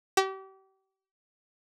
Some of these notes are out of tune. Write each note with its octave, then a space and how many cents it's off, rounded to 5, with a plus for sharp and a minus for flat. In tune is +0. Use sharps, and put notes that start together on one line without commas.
G4 -35